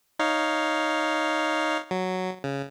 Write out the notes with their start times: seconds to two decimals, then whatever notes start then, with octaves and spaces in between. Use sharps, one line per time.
0.19 D#4 C#5 F5
1.91 F#3
2.44 C#3